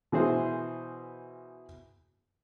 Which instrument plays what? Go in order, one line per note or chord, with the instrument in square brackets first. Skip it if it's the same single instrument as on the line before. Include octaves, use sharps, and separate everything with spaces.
[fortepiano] B2 E3 G#4 C5